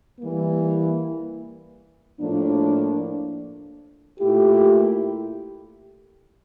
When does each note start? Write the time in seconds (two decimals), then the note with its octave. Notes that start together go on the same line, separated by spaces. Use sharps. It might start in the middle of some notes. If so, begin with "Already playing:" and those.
0.19 E3 G3 A#3
2.19 A2 F3 A#3 D4
4.19 A#2 A3 E4 G4